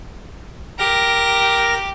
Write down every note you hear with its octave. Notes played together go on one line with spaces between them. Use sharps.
G4 A#4 A#6